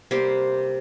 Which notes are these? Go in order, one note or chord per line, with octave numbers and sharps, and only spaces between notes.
C3 G3 A#3 G4 C5